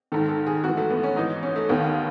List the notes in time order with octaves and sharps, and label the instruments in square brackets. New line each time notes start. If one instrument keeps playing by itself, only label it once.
[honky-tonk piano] G#2 D#3 A4
A4
G#4
G#2 E3 F#4
A3
B3
C#4
G#2 E3 D#4
C#4
A3
D#2 D#3 B3